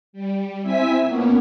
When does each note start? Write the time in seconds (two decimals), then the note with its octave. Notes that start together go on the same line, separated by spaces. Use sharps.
0.13 G3
0.63 C4 E4 E5 G#5 B6
1.03 A#2 A#3 B3 C#4